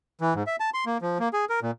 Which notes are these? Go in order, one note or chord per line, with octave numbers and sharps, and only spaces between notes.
E3
G#2
E5
A5
C6
A#3
F3
A#3
G#4
A#4
A#2